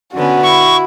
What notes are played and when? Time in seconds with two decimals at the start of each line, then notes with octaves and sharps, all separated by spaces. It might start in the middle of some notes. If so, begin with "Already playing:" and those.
0.14 D3 B3 C#4 F#4
0.43 E4 C#6